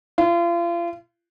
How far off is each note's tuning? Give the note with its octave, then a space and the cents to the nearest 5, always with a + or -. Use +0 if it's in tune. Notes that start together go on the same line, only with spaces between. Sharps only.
F4 -35